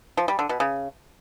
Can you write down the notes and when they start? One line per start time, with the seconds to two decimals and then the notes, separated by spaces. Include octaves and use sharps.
0.17 F3
0.28 G3
0.39 D3
0.49 B2
0.60 C#3